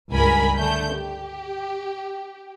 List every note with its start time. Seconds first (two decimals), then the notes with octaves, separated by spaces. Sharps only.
0.13 C#2 G2 A#4 G#5 B5 B6
0.57 D3 A3 G6
0.94 G4